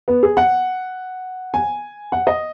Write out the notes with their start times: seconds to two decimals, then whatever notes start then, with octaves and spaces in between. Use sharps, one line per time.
0.08 B3
0.23 G#4
0.37 F#5
1.54 G#5
2.12 F#5
2.27 D#5